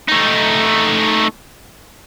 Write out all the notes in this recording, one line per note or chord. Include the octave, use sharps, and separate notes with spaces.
A3 D#4